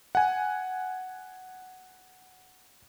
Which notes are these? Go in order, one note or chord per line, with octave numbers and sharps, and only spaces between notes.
F#5 G#5